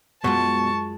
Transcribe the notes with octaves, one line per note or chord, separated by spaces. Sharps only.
F#2 B2 G#3 F4 A5 C#6